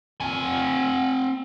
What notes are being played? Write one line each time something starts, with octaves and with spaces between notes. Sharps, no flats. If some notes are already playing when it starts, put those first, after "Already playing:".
C4 G#5